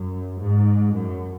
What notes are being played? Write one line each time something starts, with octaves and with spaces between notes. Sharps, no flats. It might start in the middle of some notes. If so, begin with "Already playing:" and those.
Already playing: F#2
G#2
F#2